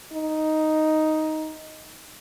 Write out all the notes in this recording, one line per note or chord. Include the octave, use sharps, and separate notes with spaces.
D#4